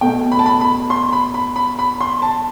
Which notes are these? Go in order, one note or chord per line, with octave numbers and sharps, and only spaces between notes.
B2 A3 G5
B5
A5
B5
B5
C6
B5
B5
B5
B5
C6
A5